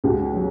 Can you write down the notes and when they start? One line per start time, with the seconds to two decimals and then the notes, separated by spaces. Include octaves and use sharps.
0.04 C#2 F#4
0.33 F#3